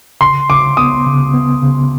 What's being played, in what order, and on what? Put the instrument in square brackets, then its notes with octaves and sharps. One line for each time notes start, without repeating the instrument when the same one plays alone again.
[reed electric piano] C#3 [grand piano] C6
[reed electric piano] C#3 [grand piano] D6
[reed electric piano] B3 [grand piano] D#6
[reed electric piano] C#3
B3
C#3